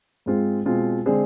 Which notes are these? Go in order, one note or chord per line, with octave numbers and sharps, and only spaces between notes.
G#2 G#3 C4 F4 G#4
B2 G#3 C4 F4
D3 G#3 C4 G#4 C5